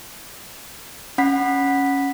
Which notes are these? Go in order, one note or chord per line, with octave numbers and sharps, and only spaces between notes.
C#4 F#5 B5 B6